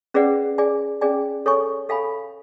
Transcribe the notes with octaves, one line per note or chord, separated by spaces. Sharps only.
C#4 G#4 B4 D5 F#5
G#4 D5 G#5
C#4 G#4 D5 G#5
A4 C#5 G#5 C#6
A4 F5 G#5 B5